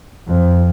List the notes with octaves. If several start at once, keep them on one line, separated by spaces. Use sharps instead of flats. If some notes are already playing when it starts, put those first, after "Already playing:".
F2